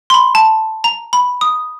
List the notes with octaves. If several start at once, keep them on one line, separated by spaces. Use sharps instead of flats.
C6
B5
A5
A#5
B5
D#6